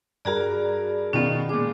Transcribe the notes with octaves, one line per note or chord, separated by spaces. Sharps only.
G2 F#4 G#4 A#4 D5
B2 D#3 B3 C#4 F4
A#2 G#3 G#4 D6